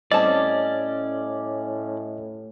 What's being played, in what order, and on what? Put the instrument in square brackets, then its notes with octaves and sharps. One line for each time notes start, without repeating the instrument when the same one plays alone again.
[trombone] A2 [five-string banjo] G3 C4 A5 [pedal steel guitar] C#4 D5 [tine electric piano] D#5